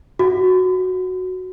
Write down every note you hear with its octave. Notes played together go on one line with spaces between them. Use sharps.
F#4